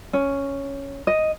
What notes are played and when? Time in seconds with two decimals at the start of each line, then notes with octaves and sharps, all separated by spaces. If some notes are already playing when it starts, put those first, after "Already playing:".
0.13 C#4
1.07 D#5